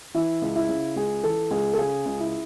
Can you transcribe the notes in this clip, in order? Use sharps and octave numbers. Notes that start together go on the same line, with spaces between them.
E3 E4
C#2
E4
C#3
C#2 G#4
E3 A4
C#2 G#4
A4
C#3 G#4
C#2
E4